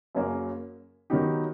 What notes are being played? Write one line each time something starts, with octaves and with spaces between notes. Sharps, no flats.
F#2 C#3 F#3 A#3
D#3 F#3 B3 D#4 G4